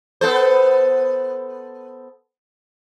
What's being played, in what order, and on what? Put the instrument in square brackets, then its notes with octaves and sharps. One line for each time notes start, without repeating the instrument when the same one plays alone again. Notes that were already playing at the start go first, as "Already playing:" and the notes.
[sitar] B3 A4 C5